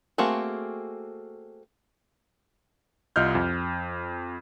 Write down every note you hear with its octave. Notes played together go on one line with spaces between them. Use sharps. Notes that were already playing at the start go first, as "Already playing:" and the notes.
A3 A#3 C4 F#4 G#4
C2 F4 D#5 F6 G6
F2